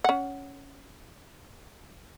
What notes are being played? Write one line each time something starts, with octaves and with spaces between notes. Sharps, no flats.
C#4 F#5